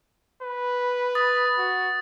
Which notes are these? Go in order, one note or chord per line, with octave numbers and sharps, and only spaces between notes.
B4
D#6 A6
F#4